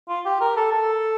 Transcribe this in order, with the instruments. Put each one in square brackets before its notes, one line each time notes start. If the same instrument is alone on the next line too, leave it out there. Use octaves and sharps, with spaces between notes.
[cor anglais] F4
G4
A#4
A4
A4